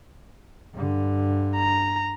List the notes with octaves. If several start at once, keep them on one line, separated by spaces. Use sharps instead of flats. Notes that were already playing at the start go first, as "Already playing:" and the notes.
G2 D3
A#5